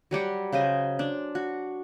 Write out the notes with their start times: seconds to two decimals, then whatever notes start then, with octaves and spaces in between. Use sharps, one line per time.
0.11 F#3 G3 G4 F#5
0.53 C#3 C5 D#5 G#5
0.99 D4
1.35 F#4